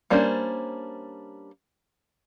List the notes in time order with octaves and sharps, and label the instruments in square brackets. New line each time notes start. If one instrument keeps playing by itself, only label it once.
[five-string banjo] G3 A#3 C#4 D4 C5